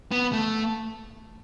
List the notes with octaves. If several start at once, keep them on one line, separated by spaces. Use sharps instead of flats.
B3
A3